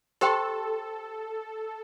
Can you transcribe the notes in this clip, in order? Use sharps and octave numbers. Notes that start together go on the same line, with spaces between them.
G4 A4 C5 G5 C6